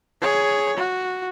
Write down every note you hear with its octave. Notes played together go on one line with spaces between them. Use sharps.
G#4 C#5
F#4